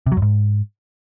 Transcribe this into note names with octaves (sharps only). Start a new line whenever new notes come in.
C3
F#3
F#2
G#2